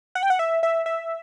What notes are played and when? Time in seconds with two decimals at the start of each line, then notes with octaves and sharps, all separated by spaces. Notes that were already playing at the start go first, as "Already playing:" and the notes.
0.15 F#5
0.23 G5
0.30 F#5
0.39 E5
0.63 E5
0.86 E5